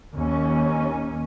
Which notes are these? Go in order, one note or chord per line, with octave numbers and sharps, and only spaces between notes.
D#2 C#4